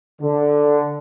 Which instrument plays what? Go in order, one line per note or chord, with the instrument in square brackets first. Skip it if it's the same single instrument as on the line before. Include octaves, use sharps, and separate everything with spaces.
[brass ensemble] D3